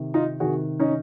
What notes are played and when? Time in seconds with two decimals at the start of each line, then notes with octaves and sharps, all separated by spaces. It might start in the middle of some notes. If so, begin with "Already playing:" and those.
Already playing: C3 D#3
0.14 D#4 F4
0.40 C3 D#3 F#4 G#4
0.79 C#4 D#4